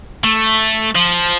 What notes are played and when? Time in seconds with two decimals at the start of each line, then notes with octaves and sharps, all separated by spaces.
0.24 A3
0.95 F3